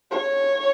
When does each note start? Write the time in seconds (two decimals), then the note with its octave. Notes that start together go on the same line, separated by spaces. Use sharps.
0.11 C#5